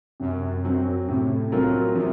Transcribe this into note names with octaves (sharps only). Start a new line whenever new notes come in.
F#2 C3
F#3 C4
A2 C3
F#3 C4 F4 A#4
C3 F3